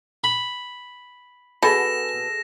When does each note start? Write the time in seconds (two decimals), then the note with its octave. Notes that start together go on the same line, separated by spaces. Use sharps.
0.24 B5
1.63 B2 G#4 A4 F#5 A#6 E7